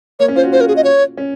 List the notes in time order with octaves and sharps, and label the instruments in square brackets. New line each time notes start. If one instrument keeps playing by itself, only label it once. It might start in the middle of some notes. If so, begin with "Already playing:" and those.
[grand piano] A#3 [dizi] C#5
[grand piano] C#4
[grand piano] F4 [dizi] C5
[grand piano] F#4
[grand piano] F4 [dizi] C5
[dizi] A#4
G#4
D#5
C#5
[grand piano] C#4